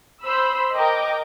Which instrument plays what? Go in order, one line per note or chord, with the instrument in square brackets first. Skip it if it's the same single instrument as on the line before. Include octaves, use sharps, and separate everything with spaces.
[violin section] C5 B5 E6
A#4 D#5 G5 D6